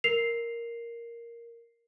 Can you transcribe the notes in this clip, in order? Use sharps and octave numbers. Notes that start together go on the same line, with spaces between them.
A#4 C7 F7